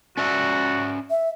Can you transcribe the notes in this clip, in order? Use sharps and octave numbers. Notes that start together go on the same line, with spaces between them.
C#4 F#4 D5 E5
E5